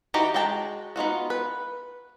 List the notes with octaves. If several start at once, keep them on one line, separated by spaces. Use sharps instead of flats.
E3 D#4 F#4 G4 A#5
G#3 F#4 G5 A5 A#5
B3 D#4 F4 F#4
B4